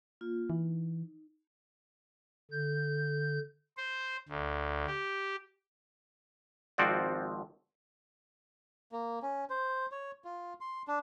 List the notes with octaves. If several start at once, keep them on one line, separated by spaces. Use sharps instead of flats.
A#3 F4
E3 D#4
D3 G6
C5
D2
G4
G#1 F3 C4 F#4 D5
A#3
C#4
C5
C#5
F4
C6
D4